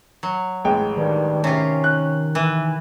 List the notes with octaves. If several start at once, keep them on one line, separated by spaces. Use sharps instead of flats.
F#3
A1 G#3 G5
G2 D#3
C3 C#4 F4
F#6
E3